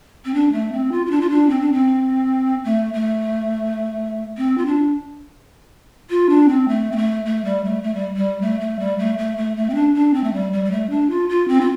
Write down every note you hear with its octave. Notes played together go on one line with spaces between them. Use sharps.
C4
D4
A3
C4
F4
F4
D4
F4
D4
C4
D4
C4
A3
A3
C4
F4
D4
F4
D4
C4
A3
C4
A3
A3
G3
A3
A3
G3
G3
A3
A3
G3
A3
A3
A3
A3
C4
D4
D4
C4
A3
G3
G3
G3
A3
D4
F4
F4
C4
F4